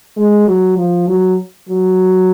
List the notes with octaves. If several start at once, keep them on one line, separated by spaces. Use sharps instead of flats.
G#3
F#3
F3
F#3
F#3